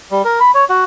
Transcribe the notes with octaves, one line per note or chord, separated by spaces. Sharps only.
G3
A#4
B5
C#5
F#4